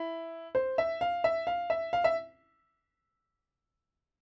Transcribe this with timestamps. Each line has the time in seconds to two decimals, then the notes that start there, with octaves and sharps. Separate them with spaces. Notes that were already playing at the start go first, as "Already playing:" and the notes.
Already playing: E4
0.55 C5
0.78 E5
1.01 F5
1.24 E5
1.47 F5
1.70 E5
1.93 F5
2.04 E5